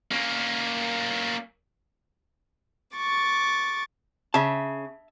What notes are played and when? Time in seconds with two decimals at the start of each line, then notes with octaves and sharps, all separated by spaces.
0.11 A#3 C#4
2.96 C#6 D6 A6
4.34 C#3 E5 A5